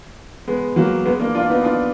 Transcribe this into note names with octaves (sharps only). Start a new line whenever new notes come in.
G#3 B3
F#3 A#3
G#3 B3
A#3 D4
D4 F4
B3 D#4
D4 F4